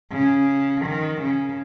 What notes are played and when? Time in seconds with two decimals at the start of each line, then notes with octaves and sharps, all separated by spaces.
0.12 C#3
0.86 D#3
1.22 C#3